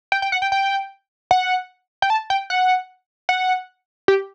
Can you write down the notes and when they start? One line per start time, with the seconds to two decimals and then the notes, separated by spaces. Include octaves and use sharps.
0.12 G5
0.22 G5
0.32 F#5
0.42 G5
0.52 G5
1.31 F#5
2.02 G5
2.10 A5
2.30 G5
2.50 F#5
3.29 F#5
4.08 G4